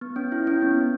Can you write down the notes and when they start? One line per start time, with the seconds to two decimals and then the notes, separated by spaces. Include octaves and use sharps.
0.01 B3
0.16 C#4
0.32 E4
0.47 C#4
0.62 B3